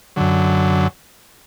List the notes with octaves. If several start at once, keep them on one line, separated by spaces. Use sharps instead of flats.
F#2 D3 F#3